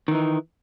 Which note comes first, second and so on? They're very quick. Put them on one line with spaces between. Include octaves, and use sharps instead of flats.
D#3 E3 D#4